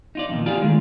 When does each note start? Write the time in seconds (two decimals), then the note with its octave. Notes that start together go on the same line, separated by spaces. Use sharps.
0.15 D#4 F4 D5
0.29 F2 A#2 D#3
0.46 D#4 F4 G4 G#4 D5 F5
0.61 D#3 G#3 A3 D4